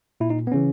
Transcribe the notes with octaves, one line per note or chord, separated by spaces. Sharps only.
A#2 E4
D#4
B3
C#3 E3 C#4